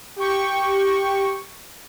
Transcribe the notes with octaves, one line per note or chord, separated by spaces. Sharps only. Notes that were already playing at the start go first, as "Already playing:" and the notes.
G4 G5 C#6